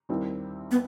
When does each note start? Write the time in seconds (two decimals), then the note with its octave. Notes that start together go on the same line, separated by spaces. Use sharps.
0.09 D#2 D#3 G3 C4 E4
0.71 B3